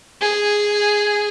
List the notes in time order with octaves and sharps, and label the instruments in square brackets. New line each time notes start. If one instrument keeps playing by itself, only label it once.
[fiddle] G#4